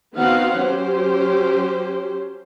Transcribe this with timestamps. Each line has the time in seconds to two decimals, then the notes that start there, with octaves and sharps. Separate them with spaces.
0.17 D#3 B3 C4 F#4 F5 F#5
0.58 F#3 C#4 G4 C5